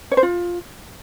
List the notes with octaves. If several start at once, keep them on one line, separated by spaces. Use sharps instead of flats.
C#5
C5
F4